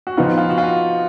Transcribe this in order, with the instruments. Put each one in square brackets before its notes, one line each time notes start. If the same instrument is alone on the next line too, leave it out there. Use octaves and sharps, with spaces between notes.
[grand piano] F#4
[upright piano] F3 B3 D#4 [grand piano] F4
[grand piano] F4
F#4
F4